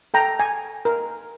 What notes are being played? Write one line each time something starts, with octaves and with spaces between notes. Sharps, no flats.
A4 G5 A#5
G#5
A#4